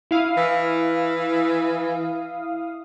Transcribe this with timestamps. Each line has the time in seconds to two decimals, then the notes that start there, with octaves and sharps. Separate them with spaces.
0.11 E4 F5 D#6
0.38 E3